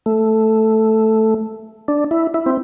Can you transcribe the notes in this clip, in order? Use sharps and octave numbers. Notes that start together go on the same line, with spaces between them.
A3
D4
E4
E4
C4